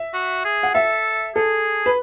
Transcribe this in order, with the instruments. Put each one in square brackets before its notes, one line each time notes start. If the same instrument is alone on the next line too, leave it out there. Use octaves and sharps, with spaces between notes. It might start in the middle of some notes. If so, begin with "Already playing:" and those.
Already playing: [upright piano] E5
[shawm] F#4
G#4
[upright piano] F#5
[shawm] A4 [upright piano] E5
[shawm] G#4 [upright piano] A4
[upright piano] B4